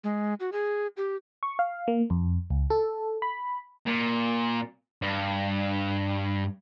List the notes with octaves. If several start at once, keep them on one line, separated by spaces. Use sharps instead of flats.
G#3
F#4
G#4
G4
C#6
F5
A#3
F2
C#2
A4
B5
A#2
G2